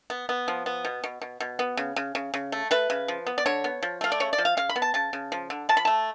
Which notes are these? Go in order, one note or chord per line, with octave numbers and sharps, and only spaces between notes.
B3
B3
F3
B3
B2
B2
B2
B2
B3
C#3
C#3
C#3
C#3
A3
A3 B4
C#3
F3
B3
D5
D3 C#5
B3
F3
A3 F5
D5
C#3 C#5
D5
F3
F5
C#3 F5
B5
B3
A5
C#3 A5
C#3
F3
D3
F3 A5
B5
A3 A5